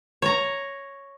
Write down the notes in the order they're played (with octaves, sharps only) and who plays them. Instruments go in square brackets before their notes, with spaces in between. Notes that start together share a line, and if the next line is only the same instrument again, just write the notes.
[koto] C#5 A#5